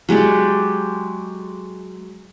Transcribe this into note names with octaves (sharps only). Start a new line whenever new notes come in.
F#3 G#3 G4 D5